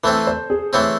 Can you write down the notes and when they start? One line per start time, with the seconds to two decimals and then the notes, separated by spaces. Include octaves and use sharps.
0.04 E3 A3 C4 A4
0.27 C5
0.50 G#4
0.73 E3 A3 C4 C#5